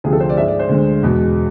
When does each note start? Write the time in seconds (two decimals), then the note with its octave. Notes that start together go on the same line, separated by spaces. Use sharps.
0.04 D2 C3 F3 G#4
0.12 A4
0.20 C5
0.29 D5
0.37 G#2 G#3 E5
0.48 D5
0.59 C5
0.69 D2 D3 G#3
1.03 E2 B2 G#3